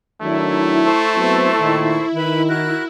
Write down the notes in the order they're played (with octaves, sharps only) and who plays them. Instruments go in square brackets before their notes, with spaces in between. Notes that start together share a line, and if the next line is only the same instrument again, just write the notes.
[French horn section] D#3 F#3 D4 [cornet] A3 [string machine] E4
[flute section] A4 C5 C#6
[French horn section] F#3 B3 C4
A#2 D#3
[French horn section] D#3 [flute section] B4 B5
[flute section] F#4 A#4 F#6